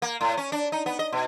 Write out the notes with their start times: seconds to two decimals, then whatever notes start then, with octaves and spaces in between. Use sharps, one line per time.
0.02 A#3
0.21 A2
0.37 C#4
0.52 D4
0.72 D#4
0.86 B3
0.99 D#5
1.13 B2